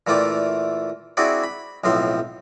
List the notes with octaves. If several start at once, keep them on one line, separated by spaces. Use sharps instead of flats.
A#2 E3 A3 F4 D5 G5
C4 D4 E4 F#4 G#4 D5
B5
B1 A2 F3 C4 C6